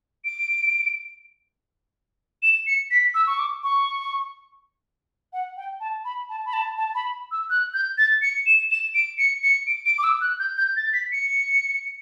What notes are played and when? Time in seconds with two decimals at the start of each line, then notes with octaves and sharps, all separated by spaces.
0.25 D7
2.43 E7
2.67 C#7
2.91 B6
3.14 E6
3.27 C#6
3.39 D6
3.63 C#6
5.33 F#5
5.57 G5
5.80 A5
6.05 B5
6.29 A5
6.46 B5
6.53 A5
6.78 A5
6.95 B5
7.32 E6
7.50 F#6
7.74 G6
7.98 A6
8.22 C#7
8.46 E7
8.71 E7
8.95 D7
9.18 C#7
9.43 C#7
9.67 D7
9.86 D7
9.98 D6
10.04 E6
10.21 F#6
10.39 G6
10.57 G6
10.76 A6
10.93 B6
11.12 C#7